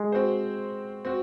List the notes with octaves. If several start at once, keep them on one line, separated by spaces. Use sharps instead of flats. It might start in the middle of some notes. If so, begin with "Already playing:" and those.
Already playing: G#3
C4 F#4 C5
C4 F#4